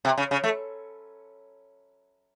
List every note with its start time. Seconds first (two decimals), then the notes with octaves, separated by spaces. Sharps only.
0.05 C3
0.18 C#3
0.31 C#3
0.44 A3